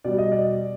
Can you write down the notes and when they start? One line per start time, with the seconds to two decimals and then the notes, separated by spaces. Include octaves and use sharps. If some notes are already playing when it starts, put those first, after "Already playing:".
0.04 B2 G3 D5
0.18 D#5
0.32 D5